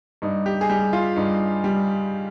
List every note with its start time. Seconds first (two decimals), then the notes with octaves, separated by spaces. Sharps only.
0.22 G2 D#4
0.46 G4
0.61 G#4
0.69 G3 G4
0.93 F4
1.16 G2 D#4
1.64 G3